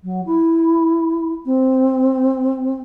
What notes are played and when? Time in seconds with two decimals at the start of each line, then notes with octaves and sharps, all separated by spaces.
0.03 F#3
0.26 E4
1.45 C4